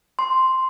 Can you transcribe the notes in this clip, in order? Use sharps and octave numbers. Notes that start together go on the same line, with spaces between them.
C6